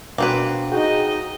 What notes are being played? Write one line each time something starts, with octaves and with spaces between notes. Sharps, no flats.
B2 A#3 C4 D4 F#4 B4
D#4 F#4 G#4 D#5 G5